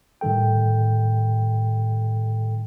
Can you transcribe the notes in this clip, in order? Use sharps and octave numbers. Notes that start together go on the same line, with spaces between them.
A2 D#3 G3 A4 G5